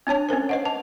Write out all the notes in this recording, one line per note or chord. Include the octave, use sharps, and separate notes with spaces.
C4 D4 C#5 A5
C4 C#4 A#4 C5
B4 D#5 F#5
A5